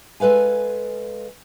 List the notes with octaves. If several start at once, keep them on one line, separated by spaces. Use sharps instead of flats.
G#3 A4 B4 F5 G#5